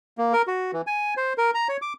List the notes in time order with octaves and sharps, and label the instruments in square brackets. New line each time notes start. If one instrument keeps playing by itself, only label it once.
[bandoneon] A#3
A#4
F#4
E3
G#5
C5
A#4
A#5
C#5
D6